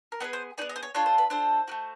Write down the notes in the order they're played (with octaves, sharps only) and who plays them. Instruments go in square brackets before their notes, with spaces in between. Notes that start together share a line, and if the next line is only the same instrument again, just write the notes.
[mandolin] A#4
B3 D#4 G#4 B4
C5
D#4 G#4 D5
B3
D#5
C5
C#5
D4 F4 A4 C#5
C5
B4
D4 F4 A4 C5
A3 D4 F#4